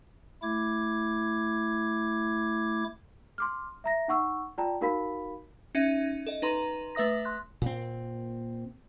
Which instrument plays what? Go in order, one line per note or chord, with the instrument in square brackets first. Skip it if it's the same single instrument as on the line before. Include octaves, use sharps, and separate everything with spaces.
[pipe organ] A3 E4 D6 G#6
[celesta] C6 D6 F6
E5 A#5 A#6
D#4 F#5 C#6 E6
F4 D5 G5 A5 A#5
D#4 F#4 A#4 F5 B5 B6
[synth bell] C#4 D#4 E5
A4 D#5
D#4 B4 A#5 C6
A3 B4 E5 D#6 A#6
C6 F#6
[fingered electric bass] A#2 C4